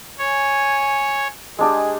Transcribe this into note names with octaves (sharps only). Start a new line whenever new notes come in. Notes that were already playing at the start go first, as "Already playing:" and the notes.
C#5 G#5
G#3 D4 G4 G#4